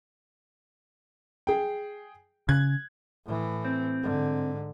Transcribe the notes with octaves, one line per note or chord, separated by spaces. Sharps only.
G#4 G5
C#3 F#6 G#6
A2 E3
C4
G#2 D3